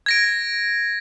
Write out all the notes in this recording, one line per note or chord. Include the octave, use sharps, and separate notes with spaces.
G#6 A#6 D7